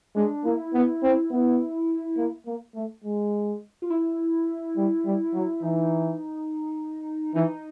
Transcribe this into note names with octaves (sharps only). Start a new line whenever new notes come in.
G#3 D4
A#3 E4
B3
C4
B3
A#3
A#3
A3
G#3
F4
E4
G3
G3
F#3
E3 D#4
E3 D#4